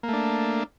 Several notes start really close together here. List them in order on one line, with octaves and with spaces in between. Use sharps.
A#3 A3 D4